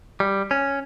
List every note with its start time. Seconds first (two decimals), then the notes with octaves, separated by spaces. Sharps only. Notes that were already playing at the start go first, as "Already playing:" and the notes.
0.20 G3
0.51 C#4